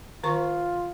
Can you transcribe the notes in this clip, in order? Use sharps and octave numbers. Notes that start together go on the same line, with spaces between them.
D#3 F4 C5 C#6